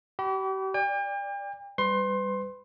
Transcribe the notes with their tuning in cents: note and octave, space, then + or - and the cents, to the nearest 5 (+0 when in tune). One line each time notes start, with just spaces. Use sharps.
G4 -40 B5 +0
D5 +0 G5 +40
G3 +5 B4 +35 C6 +20